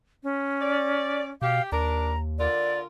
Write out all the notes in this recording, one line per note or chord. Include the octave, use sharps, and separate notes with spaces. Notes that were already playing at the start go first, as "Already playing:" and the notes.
C#4
D5
B2 G4 F5
D#2 D4 A#4 A#5
D3 F4 A#4 D5